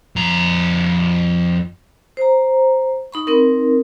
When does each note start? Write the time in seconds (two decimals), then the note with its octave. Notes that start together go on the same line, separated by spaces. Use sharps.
0.16 F2 A#5
2.17 C5 A#5
3.12 D#4 B5 C#6
3.27 C4 D#4 A#4